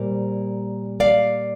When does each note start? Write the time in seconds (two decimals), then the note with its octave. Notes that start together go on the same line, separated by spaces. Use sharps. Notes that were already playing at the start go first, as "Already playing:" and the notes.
Already playing: A#2 G3 A#3 C5
1.00 D5 F5